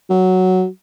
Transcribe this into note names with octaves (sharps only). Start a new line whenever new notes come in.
F#3